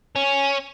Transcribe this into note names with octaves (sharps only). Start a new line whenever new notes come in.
C#4